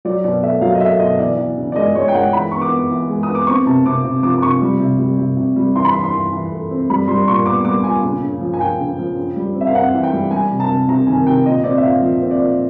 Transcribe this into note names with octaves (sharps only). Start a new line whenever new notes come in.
F#3 D5
B2 D5
A3 E5
F#3 F5
D#5
A3 E5
E5
B2 D#5
E3 D5
E3
C#3
D5
G#3 D#5
G#3 C#5
G5
G#3 F#5
E3 B5
B3 C#6
D6
B3
E3
G#3
D#6
B3
D6
C4 C#6
C3 A5
C3 D6
C3
F3 D6
D6
C3 C#6
G3
C3
G3
C3
C3
G3
E3 C6
B5
E3 C6
C6
E3
E3
A3
C4
G3 B5
G3 C6
C6
A#2 C#6
B3 D6
G3 D6
A#2 G#5
C#3
C#3
F3
G#5
F3 G5
C#3
F3
C#3
G3
C4
E5
F5
C4 F#5
E3
G5
G3
G3 G#5
C3
A5
C3
C3 A#5
D#3 G#5
C3 G5
A#2 D#5
C4 D5
E5
A#2 F5
F3
C4
D5
A#2